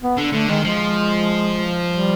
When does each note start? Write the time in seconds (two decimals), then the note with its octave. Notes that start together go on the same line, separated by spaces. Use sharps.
0.02 B3
0.17 D3
0.32 D3 A3
0.49 D#3 G#3
0.64 F3 G#3
1.89 G3